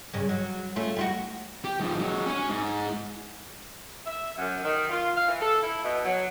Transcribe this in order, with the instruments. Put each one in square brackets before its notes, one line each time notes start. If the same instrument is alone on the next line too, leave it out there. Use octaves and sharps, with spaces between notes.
[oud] G2 C#3
F#3
A3 C#4 F4
G3 F4 F#4
[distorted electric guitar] G4
G#2 F3
F#3 G#3
C#4 G#5
G#2
[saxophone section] E5
F#2
D#3
F4
F5
E3
A4
E4
B2
F#3